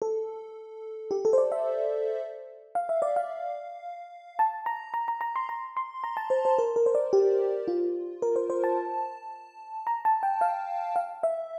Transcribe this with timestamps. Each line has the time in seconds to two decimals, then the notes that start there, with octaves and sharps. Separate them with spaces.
0.02 A4
1.11 G4
1.25 A4
1.33 C5
1.38 D5
1.52 E5
2.75 F5
2.89 E5
3.02 D5
3.16 F5
4.39 A5
4.66 A#5
4.94 A#5
5.08 A#5
5.21 A#5
5.36 C6
5.49 A#5
5.77 C6
6.04 A#5
6.17 A5
6.30 C5
6.45 C5
6.58 A#4
6.76 A#4
6.86 C5
6.95 D5
7.13 G4
7.68 F4
8.22 A#4
8.36 C5
8.50 C5
8.64 A5
9.87 A#5
10.05 A5
10.23 G5
10.41 F5
10.96 F5
11.23 E5